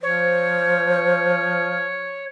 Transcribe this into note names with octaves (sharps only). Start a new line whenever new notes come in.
F3 C5 C#5